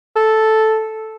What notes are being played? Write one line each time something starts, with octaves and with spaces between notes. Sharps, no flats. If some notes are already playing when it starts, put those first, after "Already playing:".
A4